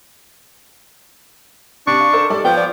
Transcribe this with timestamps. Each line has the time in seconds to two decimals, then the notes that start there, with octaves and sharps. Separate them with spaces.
1.87 C3 D4 C#6
2.01 F5
2.13 A4 A#4 C5
2.30 G3 A4 D5
2.45 F3 B3 G5
2.57 D5